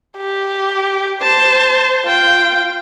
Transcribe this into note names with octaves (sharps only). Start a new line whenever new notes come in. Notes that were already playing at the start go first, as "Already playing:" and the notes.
G4
C5 A5
F4 G5